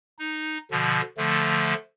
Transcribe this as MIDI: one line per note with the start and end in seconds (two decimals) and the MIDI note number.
0.19 0.58 63
0.71 1.01 47
0.71 1.01 50
0.71 1.01 53
1.18 1.74 50
1.18 1.74 53
1.18 1.74 57